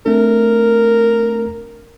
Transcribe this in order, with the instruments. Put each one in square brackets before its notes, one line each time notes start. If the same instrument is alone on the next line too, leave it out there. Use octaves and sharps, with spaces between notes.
[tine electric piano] A3 C4 D4 [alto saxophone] A#4